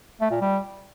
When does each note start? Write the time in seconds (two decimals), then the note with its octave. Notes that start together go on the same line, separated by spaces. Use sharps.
0.21 A3
0.31 A#2
0.41 G3